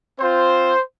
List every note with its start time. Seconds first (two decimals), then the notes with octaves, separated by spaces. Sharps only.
0.19 C4 F4 C5